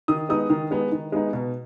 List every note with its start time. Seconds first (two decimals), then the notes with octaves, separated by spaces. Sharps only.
0.08 D#3 D#6
0.29 G#3 B3 D#4 D#6
0.50 D#3
0.71 G#3 B3 D#4
0.92 D#3
1.12 G#3 B3 D#4
1.33 B2